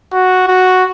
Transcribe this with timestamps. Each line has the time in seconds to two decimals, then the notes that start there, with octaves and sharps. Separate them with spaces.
0.13 F#4
0.48 F#4